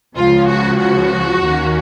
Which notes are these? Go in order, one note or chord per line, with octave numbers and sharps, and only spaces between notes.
C#2 C#3 F3 F4
F#4
F#4
D#2 D#3 A#3 C#4